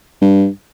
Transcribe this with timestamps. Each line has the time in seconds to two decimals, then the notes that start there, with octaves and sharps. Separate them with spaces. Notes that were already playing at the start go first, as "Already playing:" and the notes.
0.22 G2